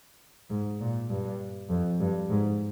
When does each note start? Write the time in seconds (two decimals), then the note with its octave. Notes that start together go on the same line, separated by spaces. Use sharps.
0.50 G#2
0.81 A#2
1.10 G2
1.70 F2
2.00 G2
2.30 G#2